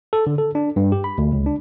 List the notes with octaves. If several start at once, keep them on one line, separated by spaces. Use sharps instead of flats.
A4
D3
A4
D4
G2
G4
B5
D2
C#2
D4